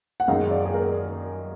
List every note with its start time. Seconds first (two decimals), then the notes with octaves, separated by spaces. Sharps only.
0.20 F#5
0.28 F#2 D#3 G#3 D#4 F5
0.51 D5
0.65 G#4
0.74 A#4